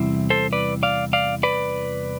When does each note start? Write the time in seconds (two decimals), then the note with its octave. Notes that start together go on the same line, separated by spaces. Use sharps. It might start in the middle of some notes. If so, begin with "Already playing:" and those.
Already playing: E2 C3 G3 C4 E4
0.30 A4 C5
0.53 B4 D5
0.83 D5 F5
1.13 D5 F5
1.43 B4 D5